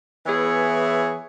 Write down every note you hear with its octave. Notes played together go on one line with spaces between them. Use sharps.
E3 B3 E4 G#4 C#5